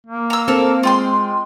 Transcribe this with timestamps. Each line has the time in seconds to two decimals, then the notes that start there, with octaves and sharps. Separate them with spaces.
0.07 A#3
0.30 A#5 E6
0.48 C4 A4 A#4
0.83 G#3 F4 G5 C6